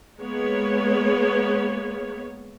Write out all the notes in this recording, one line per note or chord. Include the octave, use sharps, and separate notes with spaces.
G#3 A#3 B3 C#5